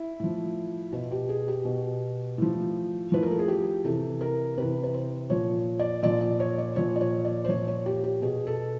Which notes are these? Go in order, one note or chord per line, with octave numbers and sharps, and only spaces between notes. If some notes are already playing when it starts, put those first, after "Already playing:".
Already playing: E4
A2 F3
B2 F4
G4
G#4
G4
B2
A2 F3
A2 F3 B4
A#4
A4
G#4
G4
C3 E3 A4
A#4
C3 E3 B4
B4
C5
A#2 F3 C#5
D5
A#2 F3 D5
D5
C#5
D5
A#2 F3 C#5
D5
C#5
D5
C5
A#2 F3 C#5
C#5
G4
G4
B2 G#4
A4